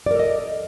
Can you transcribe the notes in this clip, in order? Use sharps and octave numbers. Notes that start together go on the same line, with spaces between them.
A4 A#4 D5 D#5